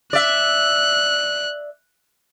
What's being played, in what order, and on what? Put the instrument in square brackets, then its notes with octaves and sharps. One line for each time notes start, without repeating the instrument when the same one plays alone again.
[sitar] D5 E5 [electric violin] F#6